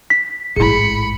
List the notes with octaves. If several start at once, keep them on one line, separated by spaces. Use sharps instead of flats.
B6
A1 G#2 E4 G#4 B5 C#7